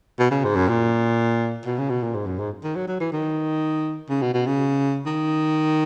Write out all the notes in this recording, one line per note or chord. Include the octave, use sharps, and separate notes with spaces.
B2
C#3
G#2
F#2
A#2
B2
C#3
B2
A#2
G#2
F#2
G#2
D#3
F#3
F#3
E3
D#3
C#3
B2
B2
C#3
D#3